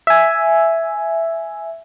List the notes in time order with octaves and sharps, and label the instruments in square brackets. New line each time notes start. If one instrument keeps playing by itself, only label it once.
[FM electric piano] E5 G#5